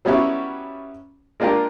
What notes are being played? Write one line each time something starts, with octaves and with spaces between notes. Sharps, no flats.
F#3 G3 B3 C#4 E4 F#4
G#3 A#3 D4 F4 G4 A#4